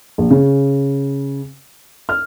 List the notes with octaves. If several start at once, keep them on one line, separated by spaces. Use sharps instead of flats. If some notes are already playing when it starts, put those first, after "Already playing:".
A#1
C#3
F6